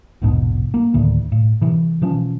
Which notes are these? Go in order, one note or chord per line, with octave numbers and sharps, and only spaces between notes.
A#1 E2 G#2 B2
A#3
D2 A2 D#3
A2
C3 E3
B2 E3 F3 C#4